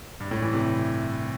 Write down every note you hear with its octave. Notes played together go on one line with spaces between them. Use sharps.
G2
A2
E3
C3